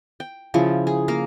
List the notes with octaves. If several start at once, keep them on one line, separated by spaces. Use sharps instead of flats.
G5
C#3 F3 E4
G#4
A#3 A#4 F5